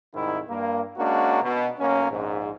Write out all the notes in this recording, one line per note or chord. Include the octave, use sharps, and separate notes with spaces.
C2 G#2 D#3 E4
G2 A#3
G#3 A#3 C#4 D4 F#4
B2
B1 A#3 C#4
A#1 G#2